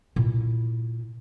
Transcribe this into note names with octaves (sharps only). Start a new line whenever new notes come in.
A#2 E4